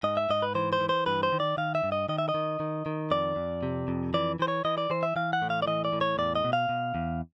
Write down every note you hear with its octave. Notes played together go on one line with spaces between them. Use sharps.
G#2 D#5
E5
G#2 D#5
B4
E3 C5
C5
E3
C5
G2 B4
C5
D#3
D5
D#3 F5
E5
G2
D#5
D#3 D#5
E5
D#5
D#3
D#3
D#3
F2 D5
F2
C3
F2
E3 D5
E3 C5
C#5
E3 D#5
D5
E3 C5
E5
E3 F5
F#5
A2
F5
D5
E3 D#5
D5
A2
C#5
E2 D5
D#5
B2
F5
B2
E2